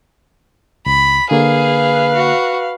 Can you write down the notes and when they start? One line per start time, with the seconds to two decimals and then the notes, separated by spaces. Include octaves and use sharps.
0.86 C#2 B5
1.31 D3 A#3 G#4 B4 F5
2.15 F#4